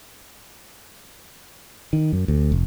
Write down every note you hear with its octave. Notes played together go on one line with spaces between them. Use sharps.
D#3
F#2
D2
F1